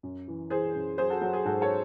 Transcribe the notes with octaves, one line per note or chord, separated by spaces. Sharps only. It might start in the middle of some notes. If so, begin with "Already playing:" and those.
F#2
E3
E3 G#4 C5
F#2
F#3 G#4 C5
F#4 A4
F#3 F#4
G#4
G#2 F#4 A4
A4 C#5